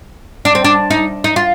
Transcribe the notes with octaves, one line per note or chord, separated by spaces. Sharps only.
D4
C4
D4
D#4
D#4
F4